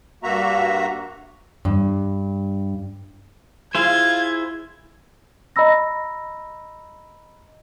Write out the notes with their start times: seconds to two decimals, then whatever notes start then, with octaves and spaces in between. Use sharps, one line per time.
0.23 G2 A#3 F#4 E5 A#5
1.65 G2
3.75 E4 F4 G#4 C5 G#6
5.56 D#5 A#5 B5 E6 A#6